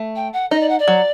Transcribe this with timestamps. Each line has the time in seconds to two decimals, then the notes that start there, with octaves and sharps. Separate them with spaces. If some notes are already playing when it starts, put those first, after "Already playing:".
Already playing: A3
0.16 G5
0.33 F#5
0.51 D#4 D#5
0.60 D5
0.69 F#5
0.79 D5
0.88 F#3